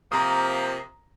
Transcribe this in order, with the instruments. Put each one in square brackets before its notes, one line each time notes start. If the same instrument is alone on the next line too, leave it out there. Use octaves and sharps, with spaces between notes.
[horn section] C3 F3 A#3 [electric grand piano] A#5 D#6